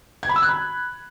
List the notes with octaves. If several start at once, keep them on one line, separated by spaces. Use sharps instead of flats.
G#6
B5
E6
F#6
B5